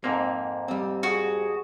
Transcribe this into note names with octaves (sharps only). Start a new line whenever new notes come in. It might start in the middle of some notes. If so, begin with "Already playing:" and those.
F2 G#2 A#3 C4
G3 C4
F#4 G#4